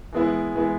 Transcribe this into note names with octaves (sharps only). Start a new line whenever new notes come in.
E3 G#3 B3 E4
E3 G#3 B3 E4